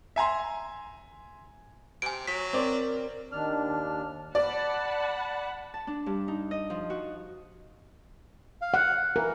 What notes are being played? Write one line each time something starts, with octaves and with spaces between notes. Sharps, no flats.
E5 G#5 A#5 C6
C3 G#5 D7
F#3 B6
C4 A#4 D5
D#2 D4 F6
D5 F#5 A5 B5
A5
D4
G2
D#4
D#5
F3
F#4
F5
F#5
E3 A#4